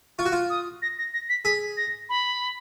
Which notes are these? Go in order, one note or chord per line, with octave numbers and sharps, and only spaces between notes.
F4 C#6
F#4
F4
D#6
A#6
A#6
A#6
B6
G#4 B6
A#6
B5